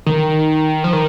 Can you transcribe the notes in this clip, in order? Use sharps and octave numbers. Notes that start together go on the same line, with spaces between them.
D#3
F3
D#3